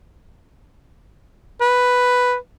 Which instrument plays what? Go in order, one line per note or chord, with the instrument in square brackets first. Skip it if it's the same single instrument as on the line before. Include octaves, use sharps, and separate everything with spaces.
[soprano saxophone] B4